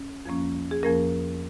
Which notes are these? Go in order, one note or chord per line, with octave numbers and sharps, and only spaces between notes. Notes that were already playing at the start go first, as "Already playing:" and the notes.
Already playing: C#4
F2 F3 A#3 C#4
G#4
F2 F3 A#3 C#4 A#4